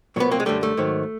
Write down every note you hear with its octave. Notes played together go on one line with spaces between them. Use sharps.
C2 A#2 F#3 B3
A#3 C4
G#3
F#2 D3 G3 A3
A3
G#2 D#3 F#3